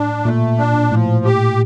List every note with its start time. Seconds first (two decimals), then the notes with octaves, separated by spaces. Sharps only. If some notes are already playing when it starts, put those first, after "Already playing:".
Already playing: A2 D4
0.25 A#2 A3
0.58 D4
0.91 A2 F3
1.25 G4